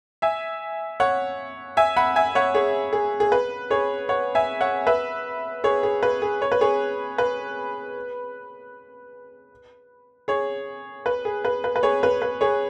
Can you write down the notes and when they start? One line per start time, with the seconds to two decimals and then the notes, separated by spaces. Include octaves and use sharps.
0.22 E5 G#5
1.00 C#5 F#5
1.77 E5 G#5
1.96 F#5 B5
2.16 E5 G#5
2.35 C#5 F#5
2.54 G#4 C#5
2.93 G#4
3.20 G#4
3.32 B4
3.70 G#4 C#5
4.09 C#5 F#5
4.35 E5 G#5
4.61 C#5 F#5
4.87 B4 E5
5.64 G#4 C#5
5.83 G#4
6.03 B4
6.22 G#4
6.42 C#5
6.52 B4
6.61 G#4 C#5
7.18 B4
10.28 G#4 C#5
11.06 B4
11.25 G#4
11.45 B4
11.64 B4
11.76 B4
11.83 G#4 C#5
12.03 B4
12.22 B4
12.41 G#4 C#5